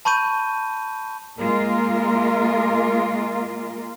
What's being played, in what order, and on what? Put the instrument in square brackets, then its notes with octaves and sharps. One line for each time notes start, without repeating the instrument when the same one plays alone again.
[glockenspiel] A5 B5 C#6 G6 D#7
[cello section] G#3 A#3 F4 A#4